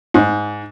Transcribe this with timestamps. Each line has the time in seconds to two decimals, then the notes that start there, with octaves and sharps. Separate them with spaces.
0.14 G#2